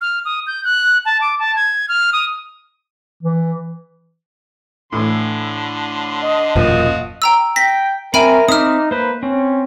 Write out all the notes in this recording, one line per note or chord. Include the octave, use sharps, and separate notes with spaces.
F6
D#6
G6
F#6
A5
D6
A5
G#6
F6
D#6
E3
A2 D3 E3 C6
D#5
E1 F#2 A#2 F3 F#4 D#6
G5 A#5 E6
G5 A#6 B6
C4 A#4 E5 G5 G#5 B5
C4 D#4 E5 D6 D#6 F6
A#3 B4 C5
C4 C#4